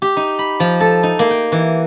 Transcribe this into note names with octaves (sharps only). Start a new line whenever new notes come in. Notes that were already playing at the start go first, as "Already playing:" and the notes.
G4
D#4
B5
F3
A4
D#4
A#3
G5
E3